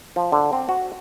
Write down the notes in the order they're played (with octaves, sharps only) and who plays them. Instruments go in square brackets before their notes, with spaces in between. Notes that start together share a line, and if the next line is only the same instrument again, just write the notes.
[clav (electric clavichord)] F3
D3
C4
F#4